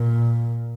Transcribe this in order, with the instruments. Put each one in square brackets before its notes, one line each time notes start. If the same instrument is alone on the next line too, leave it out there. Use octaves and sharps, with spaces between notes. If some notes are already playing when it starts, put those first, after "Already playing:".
Already playing: [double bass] A#2